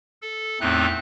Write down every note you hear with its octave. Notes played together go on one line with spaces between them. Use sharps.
A4
E2 A2 A3 C4 D#4 F#6